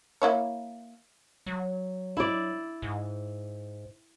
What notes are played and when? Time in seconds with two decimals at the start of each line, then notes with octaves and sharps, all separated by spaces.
0.22 A#3 E4 C#5
1.46 F#3
2.17 E4 D5
2.82 G#2